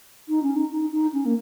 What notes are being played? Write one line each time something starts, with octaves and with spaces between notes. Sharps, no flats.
D#4
C#4
D#4
D#4
D#4
C#4
A#3